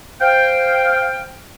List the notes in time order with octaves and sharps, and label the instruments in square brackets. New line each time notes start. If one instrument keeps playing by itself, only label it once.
[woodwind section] C5 F5 G5